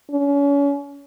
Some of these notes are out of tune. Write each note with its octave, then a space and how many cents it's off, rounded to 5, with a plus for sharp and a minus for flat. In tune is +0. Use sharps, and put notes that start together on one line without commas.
C#4 +35